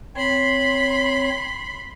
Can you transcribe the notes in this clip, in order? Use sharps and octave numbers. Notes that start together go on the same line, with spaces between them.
C4 C#5 B5 C6